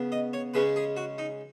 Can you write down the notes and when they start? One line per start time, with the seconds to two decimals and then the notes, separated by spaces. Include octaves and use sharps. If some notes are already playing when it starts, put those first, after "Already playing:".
Already playing: C#3 B3
0.12 D#5
0.33 C#5
0.54 C#3 G#3 C#4 B4
0.76 G#4
0.97 F#4
1.18 D#4